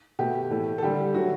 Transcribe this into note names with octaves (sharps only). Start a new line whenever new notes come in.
B2 A3 G4
A2 E3 A3
A4
D3 G3 G4
D3 F#3 A3 F#4